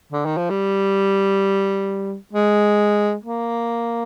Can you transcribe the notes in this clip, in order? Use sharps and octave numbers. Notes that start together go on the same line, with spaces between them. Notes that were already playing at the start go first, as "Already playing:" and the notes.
D3
D#3
F3
G3
G#3
A#3